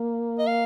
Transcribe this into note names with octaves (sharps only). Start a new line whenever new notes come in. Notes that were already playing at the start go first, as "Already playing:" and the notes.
Already playing: A#3
D#5
F5